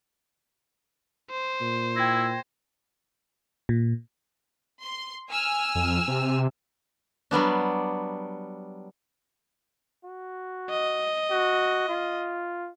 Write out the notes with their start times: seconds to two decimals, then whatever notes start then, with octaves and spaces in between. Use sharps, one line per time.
1.31 C5
1.61 A#2
1.96 E4 G5 G#6 A#6
3.69 A#2
4.83 C6
5.29 G#5 E6 F6
5.75 F2
6.08 C3
7.31 F#3 G3 B3 D4
10.05 F#4
10.70 D#5
11.31 F#4
11.89 F4